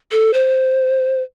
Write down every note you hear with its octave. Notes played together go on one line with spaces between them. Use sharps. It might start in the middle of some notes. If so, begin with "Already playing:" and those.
A4
C5